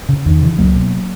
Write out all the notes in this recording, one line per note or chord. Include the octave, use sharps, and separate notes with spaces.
C#3
E2 D#3
C#3 E3
C#2 F#3 A#3
B2